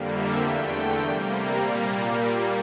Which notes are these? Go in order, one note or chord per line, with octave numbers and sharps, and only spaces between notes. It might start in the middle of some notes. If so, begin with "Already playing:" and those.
Already playing: F2 D3 G3 A#3
E5
E2 D3 A3 G5
C3 G3 A#3
A#5
A#2 G3 A#3